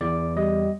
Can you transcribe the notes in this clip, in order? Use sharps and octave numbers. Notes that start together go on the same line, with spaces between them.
E2 D5
G3 D#5